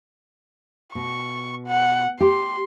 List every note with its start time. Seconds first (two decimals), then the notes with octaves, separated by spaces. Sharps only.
0.95 B2 C#6
1.67 F#5
2.21 G4 C6